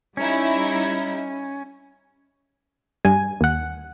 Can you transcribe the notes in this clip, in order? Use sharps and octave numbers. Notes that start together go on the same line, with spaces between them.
G3 C#4 D#4 E4
G2 G#5
D#2 F#5